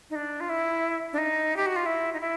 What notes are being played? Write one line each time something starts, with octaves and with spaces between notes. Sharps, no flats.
D#4
D4
F4
E4
D4
D#4
G4
F#4
F4
E4
D#4
E4